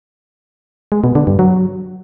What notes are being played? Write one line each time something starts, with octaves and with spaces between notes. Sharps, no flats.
G#3
B2
D3
G2
F#3